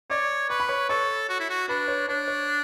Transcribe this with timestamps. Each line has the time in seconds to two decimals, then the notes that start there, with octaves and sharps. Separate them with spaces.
0.10 C#5 D5 D6
0.50 B4 C#6
0.60 B5
0.69 C#5 C#6
0.89 A4 C#5 C#6
1.29 F#4
1.40 E4
1.49 F#4
1.68 D4 B4 B5
1.88 C#5
2.08 D4 C#5
2.28 C#5